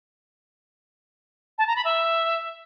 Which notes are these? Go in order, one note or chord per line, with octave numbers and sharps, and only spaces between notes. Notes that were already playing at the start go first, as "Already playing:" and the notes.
A5
A#5
B5
E5